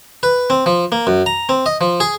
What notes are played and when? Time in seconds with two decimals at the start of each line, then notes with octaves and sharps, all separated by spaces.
0.23 B4
0.50 C4
0.66 F3
0.92 A#3
1.07 F#2
1.26 A#5
1.49 C4
1.66 D#5
1.81 F3
2.00 G#4